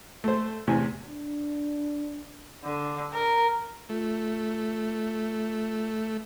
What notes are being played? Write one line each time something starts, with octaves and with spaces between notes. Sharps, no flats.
A3 C5
E2 A2 C3 G#5
D4
D3
A#4
A3 F4